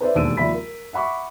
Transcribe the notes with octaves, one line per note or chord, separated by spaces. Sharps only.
B4 C5 D5 E5
E1 D#2 D4 E6 D7 D#7
D#2 F3 D5 E5 B5 B6
A#4
E5 F#5 B5 C#6 D6